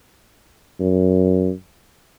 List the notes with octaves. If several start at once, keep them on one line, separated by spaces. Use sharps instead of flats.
F#2